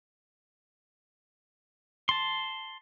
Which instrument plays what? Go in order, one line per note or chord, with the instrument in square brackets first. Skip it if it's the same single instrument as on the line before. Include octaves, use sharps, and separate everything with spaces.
[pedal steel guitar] A5 C6